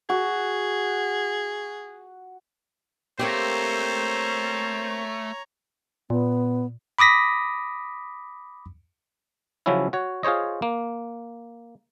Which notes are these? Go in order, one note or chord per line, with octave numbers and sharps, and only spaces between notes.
F#4 G#4
A3 A#3 C4 G4 C5 C#5 A#5
A#2 B3
B5 D6 D#6 A#6 B6
C#3 F3 F#3 C#4 E4
F#4 C#5
F4 G#4 C5 C#5 D#5
A#3